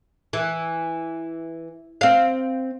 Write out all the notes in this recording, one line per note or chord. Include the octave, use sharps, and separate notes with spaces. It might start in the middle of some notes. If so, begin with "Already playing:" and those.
E3
C4 F5